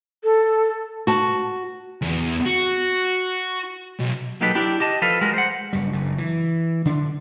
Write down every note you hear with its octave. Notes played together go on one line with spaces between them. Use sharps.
A4
F#4 A5
E2
F#4
B1
F#3 A#3 D#4 G4 A4 B4
D4 E4 G4
G4 D#5 A5
F3 A4 B4 F5
G#3 F#4 A#4
C5 F#5
F#1 G2 G3
F#1 G2
E3
D3 D4